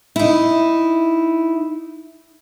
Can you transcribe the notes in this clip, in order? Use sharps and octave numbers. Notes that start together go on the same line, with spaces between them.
D#4 E4